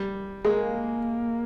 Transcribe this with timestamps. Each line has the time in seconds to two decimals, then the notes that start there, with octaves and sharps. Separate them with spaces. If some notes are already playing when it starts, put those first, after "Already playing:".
Already playing: G3
0.45 G#3 A#3